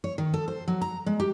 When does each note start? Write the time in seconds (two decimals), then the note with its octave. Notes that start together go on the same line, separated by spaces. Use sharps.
0.04 C#5
0.18 D#3
0.34 A4
0.48 C5
0.68 F#3
0.81 A#5
1.06 G#3
1.20 G4